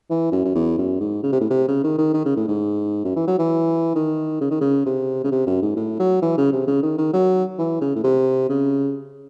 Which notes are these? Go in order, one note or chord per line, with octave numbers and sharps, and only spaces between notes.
E3
F#2
F#2
E2
F#2
G#2
C#3
C3
A2
C3
C#3
D#3
D#3
D#3
C#3
A2
G#2
F#2
E3
F#3
E3
D#3
C#3
D#3
C#3
C3
C#3
C3
F#2
G#2
A2
F#3
E3
C#3
C3
C#3
D#3
D#3
F#3
E3
C#3
A2
C3
C#3